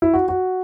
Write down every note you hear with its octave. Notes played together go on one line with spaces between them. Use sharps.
E4
F#4
F#4